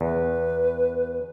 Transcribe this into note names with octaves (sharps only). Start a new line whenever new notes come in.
E2 B4